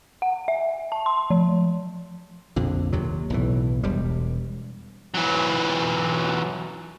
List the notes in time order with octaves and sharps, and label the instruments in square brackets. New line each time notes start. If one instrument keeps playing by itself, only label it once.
[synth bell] F#5
E5
A5
C6
F3
[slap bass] A#1 F2 D3
D#2 C3 F#3
B1 A2 E3
E1 G3
[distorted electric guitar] E3 F#3